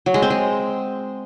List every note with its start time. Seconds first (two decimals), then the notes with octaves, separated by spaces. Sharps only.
0.06 F#3
0.14 G#3
0.22 C4
0.30 G#3